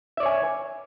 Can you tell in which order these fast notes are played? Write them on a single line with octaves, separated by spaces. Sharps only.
E5 D5 C#5 G#5